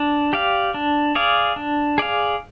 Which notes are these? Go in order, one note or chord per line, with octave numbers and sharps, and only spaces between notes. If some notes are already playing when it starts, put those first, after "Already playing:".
Already playing: D4
G4 D5 F5
D4
G#4 D5 F5
D4
G#4 D5 F5